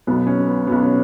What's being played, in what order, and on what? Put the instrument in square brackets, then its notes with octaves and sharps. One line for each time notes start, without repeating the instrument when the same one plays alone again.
[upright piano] B1 B2 F#3 B3
C#4
B3
B1 B2 F#3 B3
C#4